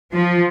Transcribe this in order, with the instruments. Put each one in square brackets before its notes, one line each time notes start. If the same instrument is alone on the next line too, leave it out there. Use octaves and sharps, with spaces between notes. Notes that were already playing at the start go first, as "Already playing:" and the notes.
[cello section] F3